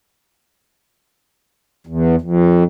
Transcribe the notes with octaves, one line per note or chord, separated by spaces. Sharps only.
E2
F2